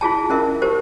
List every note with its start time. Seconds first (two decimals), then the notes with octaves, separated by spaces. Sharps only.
0.01 E4 F4 G#4 A5
0.30 C#4 A#4 E5
0.62 G4 A#4 C5